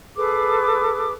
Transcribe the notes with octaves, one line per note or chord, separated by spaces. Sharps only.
G#4 A4 B4 D6